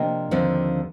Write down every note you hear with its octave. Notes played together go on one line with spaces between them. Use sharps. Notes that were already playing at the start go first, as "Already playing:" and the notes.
Already playing: C3 F3 A#3 D4 D#5 G5
D#2 D3 F3 C4